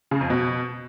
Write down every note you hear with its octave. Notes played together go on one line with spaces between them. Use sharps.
C#3
F2
B2